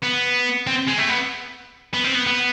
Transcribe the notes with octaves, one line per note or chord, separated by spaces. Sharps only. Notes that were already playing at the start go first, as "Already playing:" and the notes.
B3
C4
G#3
A3
B3
B3
C4
B3
B3